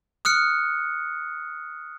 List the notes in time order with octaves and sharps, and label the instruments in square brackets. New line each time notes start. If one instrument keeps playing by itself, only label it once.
[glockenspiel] D#6 F6 F#6 C#7